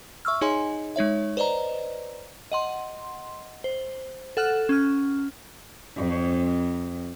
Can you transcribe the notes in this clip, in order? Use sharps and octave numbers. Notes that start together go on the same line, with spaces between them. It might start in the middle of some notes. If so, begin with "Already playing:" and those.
E5 C#6 E6 F6
D#4 G#4 C#5 D#5 G#5 C6
G#3 D#4 C#5 E5
B4 C5 D5 D#5 A#5
D#5 F#5 C6
C5
A4 F#5 F6 F#6 E7
C#4 F6
F2